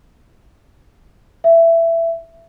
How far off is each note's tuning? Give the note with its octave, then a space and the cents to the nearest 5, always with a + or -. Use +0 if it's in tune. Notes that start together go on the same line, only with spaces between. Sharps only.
E5 +15